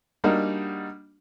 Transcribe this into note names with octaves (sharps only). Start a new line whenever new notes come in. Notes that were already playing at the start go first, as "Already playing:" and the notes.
G3 A#3 D4 D#4 F#4